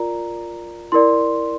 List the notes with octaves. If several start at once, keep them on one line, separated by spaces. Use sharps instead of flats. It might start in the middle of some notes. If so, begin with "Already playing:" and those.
Already playing: F4 A#4 D5 A#5
E4 A#4 D5 C6